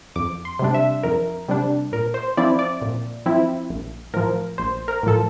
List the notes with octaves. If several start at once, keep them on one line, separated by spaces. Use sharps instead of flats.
F2 D6
C6
C3 G3 D4
E5
F2 A#4
C3 G3 D4
A#2 A#4
C5
F3 C4 E4 D5
D5
A#2
F3 C4 E4
A#1
A2 F3 A#4
A#1 C5
A#4
A2 F3 A4